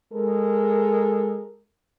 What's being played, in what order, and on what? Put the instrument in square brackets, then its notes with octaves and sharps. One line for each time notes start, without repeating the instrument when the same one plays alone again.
[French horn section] G#3 A4 A#4